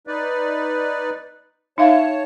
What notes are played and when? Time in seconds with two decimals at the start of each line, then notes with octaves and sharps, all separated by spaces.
0.07 D#4 B4 D5
1.78 D#4 C#5 E5 F5 A5